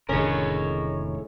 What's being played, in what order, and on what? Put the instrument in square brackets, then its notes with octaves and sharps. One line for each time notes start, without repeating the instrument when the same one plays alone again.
[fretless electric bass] F1 D3 D#3 [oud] A2 G#3 [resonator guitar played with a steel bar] C#4 [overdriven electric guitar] A#4 C#5